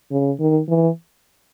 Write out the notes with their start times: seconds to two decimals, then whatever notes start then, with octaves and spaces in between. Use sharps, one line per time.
0.11 C#3
0.40 D#3
0.69 E3